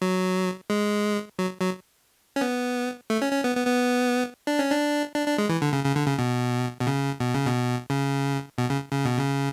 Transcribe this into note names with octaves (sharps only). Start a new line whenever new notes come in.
F#3
G#3
F#3
F#3
C#4
B3
A3
C#4
C#4
B3
B3
B3
D4
C#4
D4
D4
D4
G#3
E3
D3
C#3
C#3
D3
C#3
B2
B2
C#3
B2
C#3
B2
C#3
B2
C#3
C#3
B2
C#3